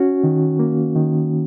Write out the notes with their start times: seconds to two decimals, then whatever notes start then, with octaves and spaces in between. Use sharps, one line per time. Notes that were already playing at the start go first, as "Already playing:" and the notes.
Already playing: C#4 F#4
0.24 D#3
0.59 A#3
0.96 D#3